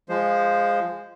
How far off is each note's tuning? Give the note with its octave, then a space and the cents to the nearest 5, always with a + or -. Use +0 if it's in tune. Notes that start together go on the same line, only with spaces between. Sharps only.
F3 +0 G#3 -15 C5 +0